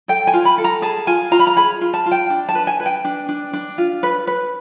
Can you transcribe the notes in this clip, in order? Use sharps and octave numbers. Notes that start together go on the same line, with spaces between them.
A4 G5
G#5
F4
B5
A4
A#5
G#4 A5
F4 G#5
F4 A#5
B5
A#5
G#4 B5
F4
A5
F4
G5
D4
A5
B4
G#5
B4
G5
D4
D4
D4
F4
B4
B4